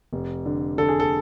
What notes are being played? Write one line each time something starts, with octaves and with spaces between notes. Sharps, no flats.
F1
D3
D3 A4
G#4
A4